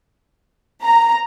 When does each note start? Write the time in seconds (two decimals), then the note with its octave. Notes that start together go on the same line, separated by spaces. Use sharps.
0.84 A#5